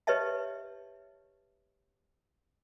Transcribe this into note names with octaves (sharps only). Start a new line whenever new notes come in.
G4 B4 C#5 D#5 E5 A5